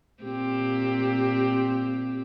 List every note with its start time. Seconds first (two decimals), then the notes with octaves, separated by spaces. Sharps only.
0.24 A#2 C4 G4